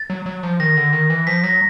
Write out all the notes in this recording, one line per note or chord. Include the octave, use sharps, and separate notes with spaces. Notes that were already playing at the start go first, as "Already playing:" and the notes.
Already playing: A6
F#3
F#3
F3
D#3 A#6
D3
D#3
E3
F3 B6
F#3 A#6